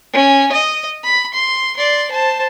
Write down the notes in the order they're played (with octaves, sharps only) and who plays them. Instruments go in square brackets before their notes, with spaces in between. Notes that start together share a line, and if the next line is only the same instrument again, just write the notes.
[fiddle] C#4
D#5
B5
C6
D5 C6
C5 A5